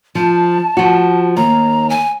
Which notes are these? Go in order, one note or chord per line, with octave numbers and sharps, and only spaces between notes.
F3 A5
F3 F#4
D#2 A#5
G#5